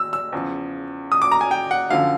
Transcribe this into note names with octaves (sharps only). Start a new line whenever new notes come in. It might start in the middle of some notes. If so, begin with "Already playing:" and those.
Already playing: E6
E6
E2 C#3 F3
D#6
D6
A#5
G#5
G5
F#5
F#2 D3 F3 F5